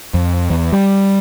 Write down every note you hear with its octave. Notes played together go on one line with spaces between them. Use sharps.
F2
E2
G3